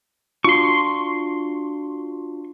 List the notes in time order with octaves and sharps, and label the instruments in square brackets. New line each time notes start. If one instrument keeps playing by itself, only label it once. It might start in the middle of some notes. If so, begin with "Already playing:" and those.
[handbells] D4 F4 F#4 [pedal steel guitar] C6 C#6